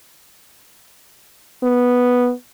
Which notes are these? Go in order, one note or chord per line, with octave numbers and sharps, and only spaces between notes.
B3